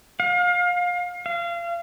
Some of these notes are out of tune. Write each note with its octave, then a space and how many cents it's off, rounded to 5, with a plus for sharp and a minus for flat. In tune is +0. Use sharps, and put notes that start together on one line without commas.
F5 +30
F5 -30